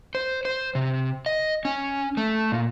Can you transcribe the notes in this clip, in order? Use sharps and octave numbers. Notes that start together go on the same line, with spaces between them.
C5
C5
C3
D#5
C#4
A3
A#2